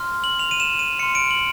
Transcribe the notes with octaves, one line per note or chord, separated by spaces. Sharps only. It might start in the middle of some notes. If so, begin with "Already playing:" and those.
Already playing: C6 F6
F#7
F7
D#7
E7
D#7
C6 F6 C#7
D7
F#7